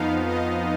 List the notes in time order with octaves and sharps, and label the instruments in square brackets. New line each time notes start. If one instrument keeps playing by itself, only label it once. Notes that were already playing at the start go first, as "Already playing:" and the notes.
Already playing: [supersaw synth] F2 F3 B3 D#4 F5
D#5